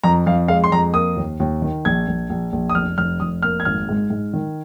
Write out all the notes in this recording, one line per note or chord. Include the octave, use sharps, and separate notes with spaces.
F2 A#5
F2 F5
G#3 F5
C6
F2 A#5
A#3 D#6
D#2
D#2
D#3
A#1 G#6
A#1
A#1
A#1
D#6
F1 F6
F1 F6
F1 D#6
A#3 F6
G#6
G#1 F6
G#2
G#2
D#3